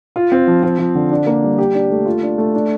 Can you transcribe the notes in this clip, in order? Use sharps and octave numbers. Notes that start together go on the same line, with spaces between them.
F4
C4
F3
C4
F3
D3
D4
A#3
G3
G4
D4
A3
F4
D4
A3
D4